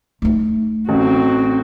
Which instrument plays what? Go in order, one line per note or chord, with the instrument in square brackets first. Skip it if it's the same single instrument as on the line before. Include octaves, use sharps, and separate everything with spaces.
[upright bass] A3 D#4
[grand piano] A1 [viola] C4 F#4